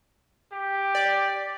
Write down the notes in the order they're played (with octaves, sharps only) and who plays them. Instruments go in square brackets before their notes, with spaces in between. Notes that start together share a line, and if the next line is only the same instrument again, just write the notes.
[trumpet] G4
[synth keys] D5